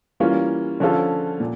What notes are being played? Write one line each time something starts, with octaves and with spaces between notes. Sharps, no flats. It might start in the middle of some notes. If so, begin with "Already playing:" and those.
E3 G3 A#3 C#4 F4
D3 F3 C#4 F4 A4
A#2